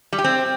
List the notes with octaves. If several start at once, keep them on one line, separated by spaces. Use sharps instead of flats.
G3
G4
C4